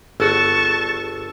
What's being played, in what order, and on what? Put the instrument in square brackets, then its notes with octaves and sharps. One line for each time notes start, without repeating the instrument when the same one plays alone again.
[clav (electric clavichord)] G1 F#4 [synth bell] G#4 E6 [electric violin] A5 C#6